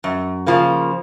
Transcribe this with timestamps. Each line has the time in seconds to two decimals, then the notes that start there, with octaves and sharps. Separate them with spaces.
0.04 F#2
0.47 C#3 F3 A#3